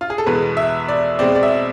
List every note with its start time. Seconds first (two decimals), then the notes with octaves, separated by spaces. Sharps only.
0.01 F4
0.10 G#4
0.18 A4
0.26 E2 B2 G#3 B4
0.57 E5
0.88 D5
1.19 B2 G#3 C4 D5
1.35 D5
1.43 E5